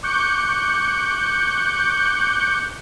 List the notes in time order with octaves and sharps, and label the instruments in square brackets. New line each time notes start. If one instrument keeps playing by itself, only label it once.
[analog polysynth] C#6 D6 F#6 G6 C#7